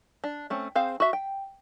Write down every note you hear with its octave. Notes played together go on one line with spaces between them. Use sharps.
D4
A3 C4 C#4
C4 G#4 C5 F5
F#4 E5
G5